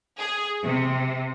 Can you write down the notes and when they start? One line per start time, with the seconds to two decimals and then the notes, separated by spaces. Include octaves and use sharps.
0.18 G#4
0.64 C3